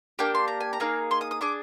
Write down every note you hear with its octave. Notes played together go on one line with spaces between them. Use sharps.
A#3 D4 G4 G5
C6
A#5
G#5
A#5
A#3 D#4 G#4
C6
D#6
D#6
D4 G#4 D6